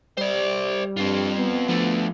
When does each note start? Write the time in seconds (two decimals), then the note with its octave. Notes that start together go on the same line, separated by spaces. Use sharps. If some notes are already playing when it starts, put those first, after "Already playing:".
0.17 G3 C5 D5
0.97 G2 C4 F4
1.37 B3
1.69 D3 F3 A3